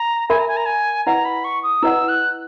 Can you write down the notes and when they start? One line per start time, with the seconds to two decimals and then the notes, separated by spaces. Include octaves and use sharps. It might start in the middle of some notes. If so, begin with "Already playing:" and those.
Already playing: A#5
0.29 A#4 E5 G#5 B5
0.39 A#5
0.48 G#5
0.57 A#5
0.66 G#5
1.06 E4 B4 D#5 F#5 A#5
1.25 B5
1.44 C#6
1.63 D#6
1.83 E4 B4 D#5 F#5 E6
2.09 F#6